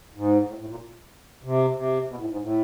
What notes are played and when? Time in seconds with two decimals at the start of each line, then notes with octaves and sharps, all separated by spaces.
0.15 G#2
0.47 A2
0.58 A2
0.68 A#2
1.44 C3
1.76 C3
2.08 B2
2.18 A2
2.30 G#2
2.41 A2